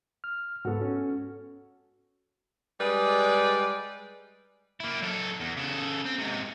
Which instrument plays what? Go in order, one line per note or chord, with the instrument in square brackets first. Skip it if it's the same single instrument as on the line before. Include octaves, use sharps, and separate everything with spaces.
[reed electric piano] F6
[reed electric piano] G#2 B3 [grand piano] F#4 A4
[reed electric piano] C#4
[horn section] G3 G#3 G#4 B4 D5
[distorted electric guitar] A#3 E4
F#3 A4
E2
C#3 A4
C4
G#2 C3